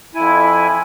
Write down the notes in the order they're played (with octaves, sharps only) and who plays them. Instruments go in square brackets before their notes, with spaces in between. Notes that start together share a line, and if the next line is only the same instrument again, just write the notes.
[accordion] F2 E4 G#5